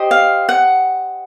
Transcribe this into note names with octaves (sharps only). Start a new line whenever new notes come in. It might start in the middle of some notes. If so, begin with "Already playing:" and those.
Already playing: G4 C5 D#5
F5
F#5